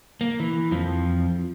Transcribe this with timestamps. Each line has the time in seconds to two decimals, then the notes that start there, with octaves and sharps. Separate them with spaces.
0.21 A#3
0.40 E3
0.71 F2 F3